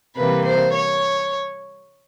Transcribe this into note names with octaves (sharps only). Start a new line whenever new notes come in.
C3 E3 G3 A#3 B4
C5
C#5